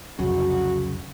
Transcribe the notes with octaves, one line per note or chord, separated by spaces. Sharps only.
C2 F2 C#3 F#3 F#4